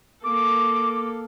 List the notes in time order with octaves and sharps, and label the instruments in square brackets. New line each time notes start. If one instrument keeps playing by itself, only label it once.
[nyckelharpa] A#3 A4 [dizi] D6